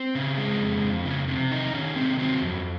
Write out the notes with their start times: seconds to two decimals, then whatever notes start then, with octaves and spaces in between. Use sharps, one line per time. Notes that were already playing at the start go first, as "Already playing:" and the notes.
Already playing: C4
0.15 C#3
0.37 G#3
0.61 F2
0.84 F2
1.05 C#3
1.28 C3
1.51 D#3 D#4
1.74 D#3 C#4
1.96 C3 C4
2.19 F#3 C4
2.41 F2